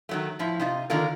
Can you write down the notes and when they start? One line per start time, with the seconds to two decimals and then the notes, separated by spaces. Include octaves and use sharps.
0.09 D#3 F#3 A3
0.39 A2 F3 E4
0.60 C3 D#4 F4
0.90 D3 D#3 A#3 F4 A#4